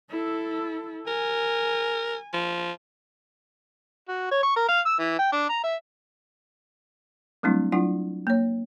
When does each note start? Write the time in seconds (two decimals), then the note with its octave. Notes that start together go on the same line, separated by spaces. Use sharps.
0.11 E4 A4
1.07 A#4 G#5
2.34 F3
4.08 F#4
4.31 C#5
4.43 C#6
4.56 A#4
4.69 F5
4.86 E6
4.99 E3
5.19 G5
5.32 D4
5.49 A#5
5.63 E5
7.43 F#3 G3 A3 C4 D4 E4
7.72 F#3 D4 E4 F4 F#5 G#5
8.27 A#3 C#5